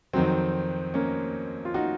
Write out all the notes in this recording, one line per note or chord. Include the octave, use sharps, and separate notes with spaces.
F2 D#3 F#3 C4
A#3 C#4
F4
D#4 F#4